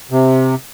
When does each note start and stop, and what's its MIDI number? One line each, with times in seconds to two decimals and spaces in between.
0.11 0.55 48